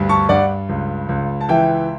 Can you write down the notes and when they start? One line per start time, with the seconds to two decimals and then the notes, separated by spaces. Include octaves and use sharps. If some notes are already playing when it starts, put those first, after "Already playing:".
Already playing: D2 G2
0.09 A5 C#6
0.29 G2 D5 F#5
0.69 C#2
1.09 C#2
1.41 A5
1.49 E3 E5 G5